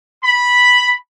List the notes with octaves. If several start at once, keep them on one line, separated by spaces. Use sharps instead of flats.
B5